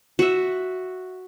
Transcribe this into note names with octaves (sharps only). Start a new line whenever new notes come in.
F#4 E5